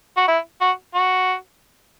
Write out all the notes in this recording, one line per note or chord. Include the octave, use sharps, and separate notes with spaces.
F#4
E4
F#4
F#4